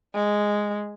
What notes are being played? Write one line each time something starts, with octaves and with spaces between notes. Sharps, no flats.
G#3